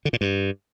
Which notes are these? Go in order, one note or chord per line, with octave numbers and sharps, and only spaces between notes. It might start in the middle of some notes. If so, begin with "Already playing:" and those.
D3
A#2
G2